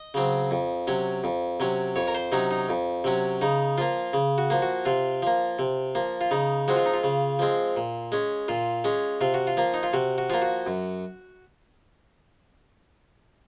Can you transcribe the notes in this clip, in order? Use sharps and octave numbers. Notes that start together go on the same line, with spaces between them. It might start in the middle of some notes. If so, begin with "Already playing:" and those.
Already playing: D#5
C#3 F#3 C4
F2
C3 F#3 C#4
F2
C3 F#3 C#4
F2 C#5
A#4
C5
C3 F#3 C#4 D#4
D#4
F2
C3 F#3 C#4
C#3 D#4
F3 A#3 F4
C#3
F#4
F3 A#3
F#4
C3 F4
F3 A#3
C3
F3 A#3
F4
C#3 D#4
F3 G#3 C4 F#4
F4
D#4
F4
C#3
F3 G#3 C4
A#2
G#3 C#4
A#2 F4
G#3 C#4
C3 F4
F#4
F4
F3 A#3
D#4
F4
C3 F#4
F#4
F3 A#3 F4
F#4
F#2